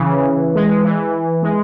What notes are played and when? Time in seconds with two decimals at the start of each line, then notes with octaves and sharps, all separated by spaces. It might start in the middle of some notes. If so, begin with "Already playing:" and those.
Already playing: C#3 E3
0.55 G#3
0.70 G#3
0.84 E3
1.43 G#3